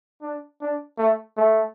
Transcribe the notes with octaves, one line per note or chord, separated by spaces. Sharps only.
D4
D4
A3
A3